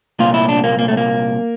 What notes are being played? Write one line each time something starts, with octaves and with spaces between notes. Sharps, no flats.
C2 A#2 F4
E4
D4
A#3
A#3
A3
A#3